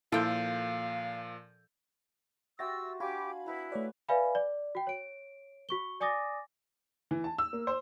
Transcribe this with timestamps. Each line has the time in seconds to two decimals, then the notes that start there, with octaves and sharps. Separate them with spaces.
0.12 A#2 F3 E4 F4 A4 F5 G6 D7
2.59 F#4 G4 E5 C6 E6 A6 A#6
3.00 D4 F#4 G4 F5 G#5 B5 D6
3.46 B3 E4 B4 A#5
3.72 A3 B4 C#5 D5 F5
4.09 B4 D5 E5 F5 G#5 B5
4.35 D5
4.75 F#4 G5
4.87 C#5 D7
5.69 F#4 C#6 G7
6.00 D5 G#5 D6 D#6 A6 A#6
7.11 E3
7.24 A5
7.38 E6
7.53 A#3
7.67 C5